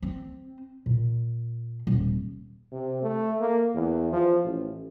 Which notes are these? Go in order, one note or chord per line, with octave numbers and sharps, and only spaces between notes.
C4
A#2
D#1
C3
A3
A#3
E2
F3
A1